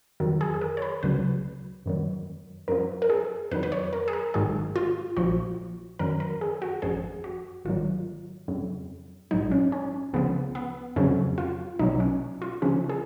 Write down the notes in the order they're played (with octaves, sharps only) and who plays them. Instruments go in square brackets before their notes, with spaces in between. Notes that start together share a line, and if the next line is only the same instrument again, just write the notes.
[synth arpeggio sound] F2 D#3 F#3
G#4
G#4
A#4
C#5
B4
C#2 C#3 F#3 B4
F#2 D#3 F#3
F#2 F3 A#4
A#4
G#4
F2 D#3 F#3 B4
B4
C#5
A#4
G#4
A#4
G#1 G#2 D#3 F#3 G#4
F4
A#1 A#2 F3 F#4
F#2 D#3 F#3 A#4
A#4
G#4
F#4
G#1 F#2 F3 G#4
F#4
G#1 G#2 D#3 F#3 F4
F2 C#3 F#3
A#1 G#2 F#3 D#4
C#4
C#4
C#2 C#3 F3 B3
B3
F2 C#3 F#3 C#4
F4
B1 B2 F#3 D#4
C#4
F4
D#2 C#3 F3 C#4
G#4